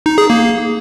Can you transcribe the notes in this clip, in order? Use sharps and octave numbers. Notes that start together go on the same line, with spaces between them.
D#4
G#4
A#3